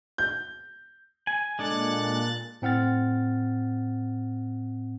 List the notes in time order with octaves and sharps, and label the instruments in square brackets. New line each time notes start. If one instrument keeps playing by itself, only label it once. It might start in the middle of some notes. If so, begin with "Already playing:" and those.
[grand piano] G6
[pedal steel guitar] G#5
[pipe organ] A#2 F#6 A6 [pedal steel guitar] G#3 D4 A4
[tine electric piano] A2 C4 F#5 F6 A6